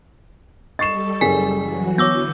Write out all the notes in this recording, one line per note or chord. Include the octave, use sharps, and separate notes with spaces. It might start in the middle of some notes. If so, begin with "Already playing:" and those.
G3 A4 D#5 C#6 A6 C7 E7
F#1 G#4 G#5 B6
E3 F#3 F#4
D3 E3 B3 C#5 D6 E6 G6 A#6